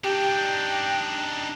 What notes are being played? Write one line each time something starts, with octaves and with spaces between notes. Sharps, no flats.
D4 D#4 G4 G5